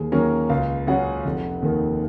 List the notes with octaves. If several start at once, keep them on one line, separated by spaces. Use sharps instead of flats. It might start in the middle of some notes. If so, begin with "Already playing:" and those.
Already playing: D#2 G#4
D#3 F#3 A#3 C#4 A#4
C#2 F5
C#3 F#3 C#4 F#5
F1
D#2 D#3